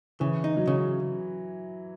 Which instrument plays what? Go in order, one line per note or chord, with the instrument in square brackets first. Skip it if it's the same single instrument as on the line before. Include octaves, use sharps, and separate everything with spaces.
[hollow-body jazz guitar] C#3 [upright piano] E3
[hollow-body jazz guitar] D#4
[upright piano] F#3
[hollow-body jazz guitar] C#3